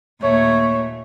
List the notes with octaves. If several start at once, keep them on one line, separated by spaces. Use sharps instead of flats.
D#2 A#2 A3 C#5